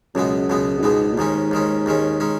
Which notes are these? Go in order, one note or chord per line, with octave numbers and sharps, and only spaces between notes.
C#2 F#2 B2 G#3 B3
C#2 B2 G#3 B3
F#2
C#2 G#2 B2 G#3 B3
A#2
D#2 G#2 D#3 G#3 C#4
D#2 D#3 G#3 C#4
D#2 D#3 G#3 C#4
D#3 G#3 C#4